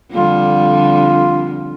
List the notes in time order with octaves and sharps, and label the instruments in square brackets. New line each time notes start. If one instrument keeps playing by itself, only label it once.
[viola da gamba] F2 D3 G3 [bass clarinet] F4